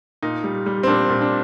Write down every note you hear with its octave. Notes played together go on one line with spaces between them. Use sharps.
A#2 D#4
G3
G3
C4
A#2 D4
A#2
D4